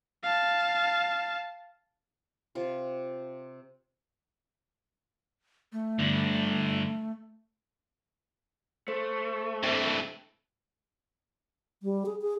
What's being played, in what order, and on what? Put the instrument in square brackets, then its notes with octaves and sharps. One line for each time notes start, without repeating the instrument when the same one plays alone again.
[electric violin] F5 A5
[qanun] C3 F4
[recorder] A3
[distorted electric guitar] G2 D3
[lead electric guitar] A3 [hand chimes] C5
[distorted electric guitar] G2 E3 [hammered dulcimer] C3 A5
[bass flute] G3
G#4
G#4